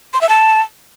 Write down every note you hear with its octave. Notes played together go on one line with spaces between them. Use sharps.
C6
E5
A5